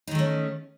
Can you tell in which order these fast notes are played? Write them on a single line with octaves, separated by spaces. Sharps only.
D#4 D#3 A3 C#4